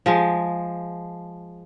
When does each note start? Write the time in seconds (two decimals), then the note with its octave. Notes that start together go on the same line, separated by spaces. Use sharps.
0.06 F3 G#3